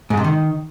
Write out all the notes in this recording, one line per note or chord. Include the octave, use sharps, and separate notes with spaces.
G#2
C3
D#3